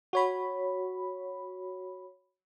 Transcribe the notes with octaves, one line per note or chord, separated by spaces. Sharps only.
F#4 C#5 B5